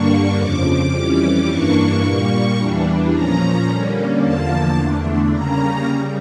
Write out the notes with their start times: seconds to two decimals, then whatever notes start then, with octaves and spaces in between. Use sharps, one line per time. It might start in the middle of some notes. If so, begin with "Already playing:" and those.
Already playing: G2 D3 G3 A#3 D4 C#6
0.36 F2 C#3 F3 D6
0.91 F2 E3 G3 C#4 D6
1.47 G2 E3 A#3 D4 C#6
2.02 A#2 G3 A#3 C#6
2.57 E2 E3 G3 D4
3.12 A#2 F3 C#4 A#5
3.66 D3 G3 A#3 C#4
4.21 E2 D3 F3 A#3 A5
4.77 E2 D3 A3 D4
5.32 C#3 G3 A#3 C#4 A#5
5.87 C#3 G3